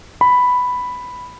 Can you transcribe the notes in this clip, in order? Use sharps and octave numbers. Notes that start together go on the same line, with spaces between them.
B5